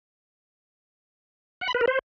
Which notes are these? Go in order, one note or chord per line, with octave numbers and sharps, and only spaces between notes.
F#5
B5
B4
A#4
C5